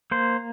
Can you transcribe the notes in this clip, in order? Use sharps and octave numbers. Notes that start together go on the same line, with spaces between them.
A#3 C5